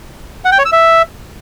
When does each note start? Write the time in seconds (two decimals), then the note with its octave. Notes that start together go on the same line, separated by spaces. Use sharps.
0.45 F#5
0.52 G5
0.59 C#5
0.65 E6
0.72 E5